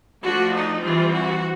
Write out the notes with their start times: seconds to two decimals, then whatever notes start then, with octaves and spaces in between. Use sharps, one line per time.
0.23 F3 A3 D4 F#4
0.52 D#4
0.82 E3 G3 C4 F4
1.12 F#4